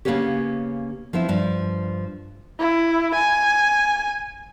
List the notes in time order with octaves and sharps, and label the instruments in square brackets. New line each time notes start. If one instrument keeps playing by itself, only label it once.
[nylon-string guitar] C#3 G#3 A#3 B3 C#4 G4
F3 B3 C4 E4
G2 F3
[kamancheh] E4
G#5